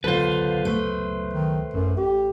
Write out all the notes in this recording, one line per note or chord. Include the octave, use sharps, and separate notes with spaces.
C#2 D3 F#3 B3 F4 A4 B4 C5
A3
D#3
A1 F#2 A2
G4